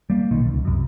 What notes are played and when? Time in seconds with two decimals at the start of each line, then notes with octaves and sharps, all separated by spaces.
0.10 G3 A#3
0.31 B1 A#2 D#3
0.46 C#2
0.65 C2 F#2